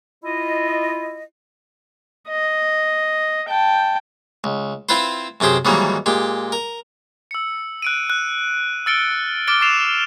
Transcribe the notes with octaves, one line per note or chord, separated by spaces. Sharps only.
E4 F4 D#5
D#5
G5 A5
C#2
C4 E4 F4 B4 C5
F#2 C3 G4 G#4 C5
G#2 D#3 E3 F#3 G3 A#3
A#2 G#3 G4
A#4
E6 C#7
F#6 D7 D#7
F#6
E6 F6 A6 C#7 D7 G7
D6 F6 A6 D7 G7
C#6 D6 A6 C7 E7 F7